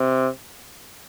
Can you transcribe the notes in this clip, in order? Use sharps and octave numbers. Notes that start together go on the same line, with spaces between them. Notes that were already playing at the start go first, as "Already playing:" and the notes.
Already playing: C3